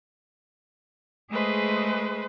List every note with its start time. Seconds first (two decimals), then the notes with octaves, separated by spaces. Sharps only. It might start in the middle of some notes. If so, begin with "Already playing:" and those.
1.31 G#3 A3 G#4 B4 C5 D#5